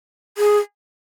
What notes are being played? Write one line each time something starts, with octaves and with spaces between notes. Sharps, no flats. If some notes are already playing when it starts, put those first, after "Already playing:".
G#4